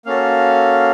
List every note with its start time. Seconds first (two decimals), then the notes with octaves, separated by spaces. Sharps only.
0.06 A#3 C#4 F#4 A4 F5